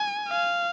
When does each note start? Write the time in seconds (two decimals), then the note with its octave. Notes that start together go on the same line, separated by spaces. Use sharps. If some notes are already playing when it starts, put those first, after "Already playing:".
Already playing: G#5
0.29 F5